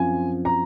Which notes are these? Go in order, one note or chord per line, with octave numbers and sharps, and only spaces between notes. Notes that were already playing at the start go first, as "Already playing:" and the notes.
Already playing: F#2 F3 C4 G#5
A#5